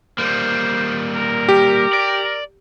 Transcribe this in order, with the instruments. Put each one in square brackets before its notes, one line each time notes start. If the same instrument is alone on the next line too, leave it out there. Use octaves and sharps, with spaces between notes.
[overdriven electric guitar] G3 A#3 [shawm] C5
[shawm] A#4
[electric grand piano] G4
[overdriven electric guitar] D5